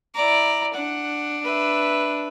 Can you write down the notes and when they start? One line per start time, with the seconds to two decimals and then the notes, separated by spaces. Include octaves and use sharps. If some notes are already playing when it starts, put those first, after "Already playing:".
0.15 E4 D5 A#5
0.75 D4 F#5
1.44 B4 E5